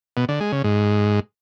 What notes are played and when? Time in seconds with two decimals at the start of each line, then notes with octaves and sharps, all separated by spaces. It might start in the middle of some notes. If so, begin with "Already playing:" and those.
0.17 B2
0.29 D3
0.40 G#3
0.52 C#3
0.64 G#2